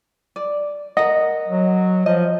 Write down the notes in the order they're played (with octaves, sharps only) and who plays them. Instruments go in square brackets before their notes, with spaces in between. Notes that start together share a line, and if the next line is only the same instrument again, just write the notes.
[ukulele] D5
[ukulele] A#4 F#5 [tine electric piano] D#5
[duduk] F#3
[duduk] F3 [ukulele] D#5